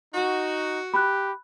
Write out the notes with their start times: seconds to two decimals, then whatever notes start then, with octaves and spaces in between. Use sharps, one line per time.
0.14 D#4 F#4
0.94 G4 B5 F#6